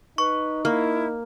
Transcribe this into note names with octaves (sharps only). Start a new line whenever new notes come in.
D#4 B4 C#6
A#3 E4